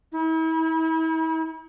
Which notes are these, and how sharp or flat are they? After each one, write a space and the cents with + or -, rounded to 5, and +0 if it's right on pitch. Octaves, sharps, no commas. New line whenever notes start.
E4 -40